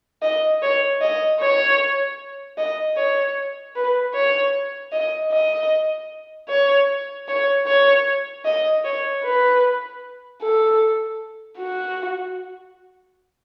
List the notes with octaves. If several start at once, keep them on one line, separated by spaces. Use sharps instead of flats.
D#5
C#5
D#5
C#5
D#5
C#5
B4
C#5
D#5
D#5
C#5
C#5
C#5
D#5
C#5
B4
A4
F#4